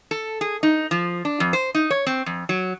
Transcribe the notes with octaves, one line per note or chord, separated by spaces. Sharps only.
A4
G#4
D#4
F3
D4
F2
C5
D#4
C#5
C4
F2
F#3